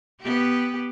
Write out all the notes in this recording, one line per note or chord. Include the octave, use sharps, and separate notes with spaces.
B3 G4